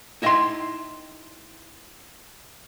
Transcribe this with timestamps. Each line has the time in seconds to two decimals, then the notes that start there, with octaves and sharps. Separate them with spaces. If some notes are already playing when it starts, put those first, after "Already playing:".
0.22 D#4 E4 D#5 F5 G5 C6